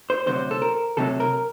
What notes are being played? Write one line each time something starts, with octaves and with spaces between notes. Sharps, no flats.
C5
D2 C3 F#3 C5
A4
A#4
D2 C3 D#3 F#3 A4
A#4